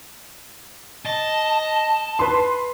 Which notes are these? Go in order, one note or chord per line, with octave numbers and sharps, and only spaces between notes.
D#5 A5
B4 C6